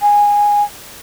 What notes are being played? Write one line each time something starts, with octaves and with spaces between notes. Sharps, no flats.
G#5